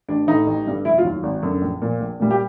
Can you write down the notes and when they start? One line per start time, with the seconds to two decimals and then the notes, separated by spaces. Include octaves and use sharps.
0.09 A1 D4
0.27 A2 E3 D#4
0.47 A1
0.66 G2 D3 G3
0.85 F1 E4
0.98 F4
1.04 D#2 D#3 F#3
1.23 G#1
1.43 F#2 D3
1.62 A#1
1.82 A#2 F3
2.01 A#1
2.20 A#2 G3
2.31 G4